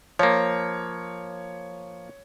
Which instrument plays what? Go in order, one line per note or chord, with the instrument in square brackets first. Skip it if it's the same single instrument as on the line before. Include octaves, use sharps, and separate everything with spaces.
[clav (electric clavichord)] F3 A#3 [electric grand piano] C#5